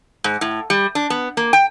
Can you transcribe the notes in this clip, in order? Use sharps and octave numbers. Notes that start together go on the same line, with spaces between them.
G#2
A2
G3
D4
B3
A#3
G5